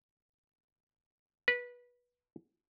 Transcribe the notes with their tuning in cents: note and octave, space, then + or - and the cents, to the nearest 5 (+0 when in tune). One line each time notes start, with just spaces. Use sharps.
B4 -20